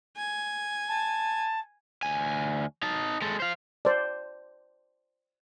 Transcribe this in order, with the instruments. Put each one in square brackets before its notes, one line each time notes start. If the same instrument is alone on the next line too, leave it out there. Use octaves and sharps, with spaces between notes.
[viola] G#5
[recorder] A5
[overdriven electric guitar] D2 G#5
D#4 A5
G#3 A4
C5 F5
[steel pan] C5 D5